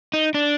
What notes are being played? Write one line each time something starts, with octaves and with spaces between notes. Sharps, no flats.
D#4
D4